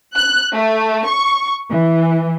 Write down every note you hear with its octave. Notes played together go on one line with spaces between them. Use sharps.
F#6
A3
C#6
E3